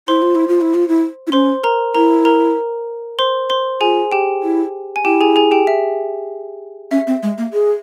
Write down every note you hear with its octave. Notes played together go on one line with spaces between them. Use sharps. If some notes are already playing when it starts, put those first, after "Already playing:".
E4 C5 C6
F4
E4
F4
E4
F4
E4
E4
C#4 C5 C6
A#4 A#5
E4 A#4 A#5
A#4 A#5
C5 C6
C5 C6
F4 G#4 G#5
G4 G5
E4
G#5
E4 G4 G5
G#4 G#5
G#4 G#5
G4 G5
E5
C#4 E5
C4
G#3
A#3
G#4